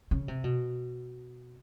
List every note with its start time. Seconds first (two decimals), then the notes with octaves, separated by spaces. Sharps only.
0.11 C#3
0.28 C3
0.44 B2